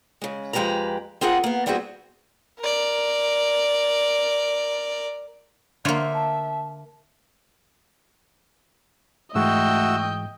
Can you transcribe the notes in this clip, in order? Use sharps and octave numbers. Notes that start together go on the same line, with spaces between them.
C#3 G#3
F2 G#3 G4 B4 A#5
C4 F4 G#4 A#4 F#5
A#3 B3
G3 B3 C4 E4 F#4 G#4
A#4 D5
D3 A#3 F4 C5 C#5 E5
A5
G#2 E3 G#3 A3 F#4 D#5 G5 E6